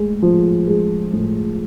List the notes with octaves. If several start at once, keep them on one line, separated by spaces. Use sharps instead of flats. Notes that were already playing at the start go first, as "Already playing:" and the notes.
Already playing: A2 G#3
F3
G#3
A2